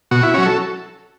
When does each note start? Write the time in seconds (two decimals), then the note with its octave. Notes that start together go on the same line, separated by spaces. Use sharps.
0.11 B2 F#4
0.23 E4
0.34 F#3 C#4 F#4
0.46 A4